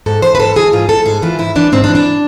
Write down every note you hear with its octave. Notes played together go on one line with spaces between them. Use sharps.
G#2 A4
E3 C5
B4
G#2 A4
E3 G#4
G#2 F4
E3 A4
G#2 G#4
E3 F4
G#2 E4
E3 D4
G#2 C4
D4
E3
D4